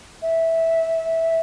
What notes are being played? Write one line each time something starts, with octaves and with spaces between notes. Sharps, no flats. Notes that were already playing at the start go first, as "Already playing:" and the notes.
E5